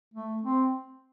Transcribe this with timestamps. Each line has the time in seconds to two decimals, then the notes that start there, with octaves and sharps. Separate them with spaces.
0.14 A3
0.43 C4